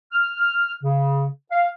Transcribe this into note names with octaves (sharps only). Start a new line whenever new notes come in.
F6
F6
C#3
F5